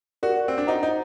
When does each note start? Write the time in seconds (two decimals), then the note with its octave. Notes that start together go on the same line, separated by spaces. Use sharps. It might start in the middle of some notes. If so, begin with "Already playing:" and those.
0.23 F#4 G4 A#4 D5
0.48 C4
0.58 D4
0.67 D#4 F#4 C5 F#5 A#5
0.83 D#4